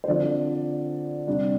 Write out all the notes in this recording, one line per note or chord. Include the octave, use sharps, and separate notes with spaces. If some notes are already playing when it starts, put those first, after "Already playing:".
C5
D3 F3 C4 D5
C3 G3 D4